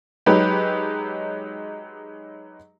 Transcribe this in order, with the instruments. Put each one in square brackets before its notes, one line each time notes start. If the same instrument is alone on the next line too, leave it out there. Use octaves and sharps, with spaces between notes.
[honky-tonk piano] F#3 G#3 D#4 G4 B4